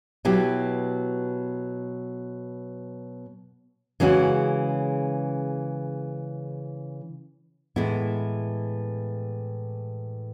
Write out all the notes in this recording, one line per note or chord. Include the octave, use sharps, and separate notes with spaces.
B2 F#3 B3 E4 G4
C#3 E3 G#3 C#4 F#4
A2 E3 G#3 B3 E4